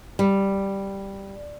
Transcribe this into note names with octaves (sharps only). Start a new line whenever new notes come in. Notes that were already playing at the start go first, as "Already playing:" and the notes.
G3